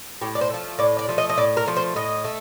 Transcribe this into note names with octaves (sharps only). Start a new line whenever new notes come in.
A2 G4
D5
C5
F3 A3
A2 D5
D5
F3 A3
D#5
D#5
A2 D5
A#4
F3 A3
C5
A2 D#5
A3